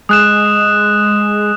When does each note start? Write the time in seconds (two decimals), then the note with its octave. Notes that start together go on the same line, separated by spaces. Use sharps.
0.09 G#3 D#6 F#6 E7